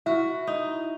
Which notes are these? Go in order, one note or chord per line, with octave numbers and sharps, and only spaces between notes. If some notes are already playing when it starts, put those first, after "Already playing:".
E4 F#4 E5
D#4